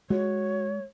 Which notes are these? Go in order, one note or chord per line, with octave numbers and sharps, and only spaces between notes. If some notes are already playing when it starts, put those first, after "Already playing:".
G#3 F#4 C#5